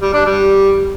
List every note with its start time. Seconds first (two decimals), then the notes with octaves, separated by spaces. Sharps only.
0.02 G3
0.13 D4
0.25 G3